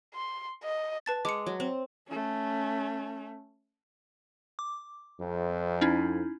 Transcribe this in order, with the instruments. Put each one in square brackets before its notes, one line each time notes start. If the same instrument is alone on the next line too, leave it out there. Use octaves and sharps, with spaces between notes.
[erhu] C6
D#5
[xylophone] B4 A5 A6
[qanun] G#3 [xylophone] D6 C#7
[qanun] F#3
C4
[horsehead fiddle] A3 C#4
[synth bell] D6
[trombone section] F2
[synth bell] C#4 D#4 E4